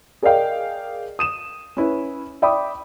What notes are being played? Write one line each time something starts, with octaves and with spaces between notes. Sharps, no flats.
G#4 A#4 D5 D#5 F5 G5
D#6 D#7 E7
C#4 E4 B4
D5 E5 G5 B5 D6 D#6